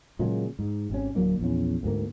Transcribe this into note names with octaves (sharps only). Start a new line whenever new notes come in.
A#2 C#3 F#3 G#3
G#2
G#1 C3 C#4
D1 F#3 A#3 D4
A#1 E2 C#4
D2 G#2 A#3